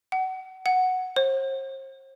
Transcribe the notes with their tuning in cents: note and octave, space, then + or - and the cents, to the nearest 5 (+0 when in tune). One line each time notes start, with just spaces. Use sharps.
F#5 +25
F#5 +0
C5 +40